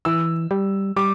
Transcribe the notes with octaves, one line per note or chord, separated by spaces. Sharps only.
E3 E6
G3
G3 D6